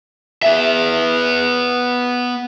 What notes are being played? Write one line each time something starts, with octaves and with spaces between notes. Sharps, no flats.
B3 E5